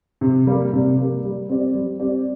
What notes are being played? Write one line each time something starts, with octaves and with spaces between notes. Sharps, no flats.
C3
G3 A#3
C3
G3 A#3
G3
C4 G4 D5
G3
C4 G4 D5